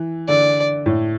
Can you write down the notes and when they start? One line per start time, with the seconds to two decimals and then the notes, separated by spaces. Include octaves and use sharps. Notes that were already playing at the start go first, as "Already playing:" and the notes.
Already playing: E3
0.28 D3 D5
0.86 A2